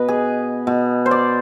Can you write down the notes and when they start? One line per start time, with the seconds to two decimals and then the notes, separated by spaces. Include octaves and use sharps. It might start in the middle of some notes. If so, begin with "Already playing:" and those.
Already playing: B2 B4 D#5
0.08 G#4
0.67 B2
1.06 C5
1.11 D5